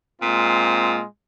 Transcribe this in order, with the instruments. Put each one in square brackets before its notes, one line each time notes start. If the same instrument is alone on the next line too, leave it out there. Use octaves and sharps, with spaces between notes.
[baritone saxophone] A#2 [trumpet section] G#3 C4 F4